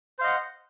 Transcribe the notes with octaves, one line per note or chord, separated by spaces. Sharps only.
C5 D#5 F5 F#5